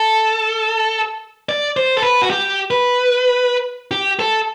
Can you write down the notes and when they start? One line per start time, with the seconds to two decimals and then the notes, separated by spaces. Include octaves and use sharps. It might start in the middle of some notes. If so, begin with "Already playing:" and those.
Already playing: A4
1.49 D5
1.77 C5
1.97 A4
2.02 B4
2.22 F#4
2.30 G4
2.71 B4
3.91 G4
4.19 A4